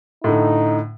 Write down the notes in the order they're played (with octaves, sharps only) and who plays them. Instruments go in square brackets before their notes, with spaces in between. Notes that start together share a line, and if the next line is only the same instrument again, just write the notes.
[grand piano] A2 D3 [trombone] D#4